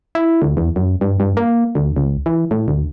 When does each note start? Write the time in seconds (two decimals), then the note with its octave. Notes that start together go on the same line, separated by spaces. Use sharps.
0.15 E4
0.42 D2
0.57 E2
0.76 F#2
1.01 G2
1.20 G2
1.37 A#3
1.75 D2
1.97 C#2
2.26 E3
2.51 A2
2.68 D2